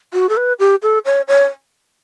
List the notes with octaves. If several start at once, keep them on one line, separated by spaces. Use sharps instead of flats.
F#4
A4
B4
G4
A4
C#5
C#5